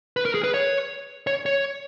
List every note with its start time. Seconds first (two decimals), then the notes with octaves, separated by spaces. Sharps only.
0.17 B4
0.25 A#4
0.34 G#4
0.44 B4
0.54 C#5
1.27 C#5
1.46 C#5